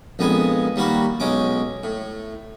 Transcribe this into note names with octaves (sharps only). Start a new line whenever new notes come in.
A#1 F2 G#3 B3 G#5
D#2 G3 A#3 F#4 B5
B1 G#3 C#4 D6
A2